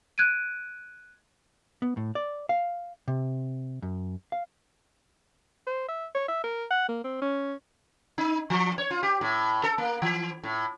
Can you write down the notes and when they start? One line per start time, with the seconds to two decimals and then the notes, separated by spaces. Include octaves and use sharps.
0.18 F#6 G#6 D7 D#7
1.82 B3
1.97 A2
2.15 D5
2.49 F5
3.08 C3
3.82 F#2
4.32 F5
5.67 C5
5.89 E5
6.15 C#5
6.28 E5
6.44 A#4
6.71 F#5
6.89 A#3
7.04 C4
7.22 C#4
8.18 D#4
8.50 F3
8.78 C#5
8.91 F4
9.03 G4
9.21 A2
9.63 A4
9.78 A#3
10.02 E3
10.43 A2